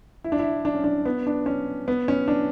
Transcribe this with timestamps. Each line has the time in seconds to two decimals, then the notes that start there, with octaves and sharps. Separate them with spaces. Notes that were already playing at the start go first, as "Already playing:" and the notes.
0.24 E4
0.32 D4
0.39 E4
0.65 D4
0.75 C#4
0.84 D4
1.06 B3
1.27 D4
1.46 C#4
1.88 B3
2.08 C#4
2.28 D4